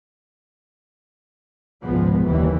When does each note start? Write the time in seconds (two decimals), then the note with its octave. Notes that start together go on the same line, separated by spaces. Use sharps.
1.83 G#1 C#2 C3 F3 G#3 B3
2.26 F#1 D#2 E3 G3